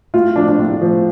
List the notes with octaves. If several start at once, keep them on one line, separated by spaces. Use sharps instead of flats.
A2 F4
F3 D4
D4
A2
F3